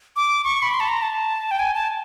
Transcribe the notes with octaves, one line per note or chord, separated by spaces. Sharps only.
D6
C#6
B5
C6
A5
A#5
A5
G5
G#5
A5